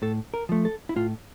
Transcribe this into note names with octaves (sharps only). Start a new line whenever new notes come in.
A2 A4
A#4
F3 A3
A4
E4
A2 F4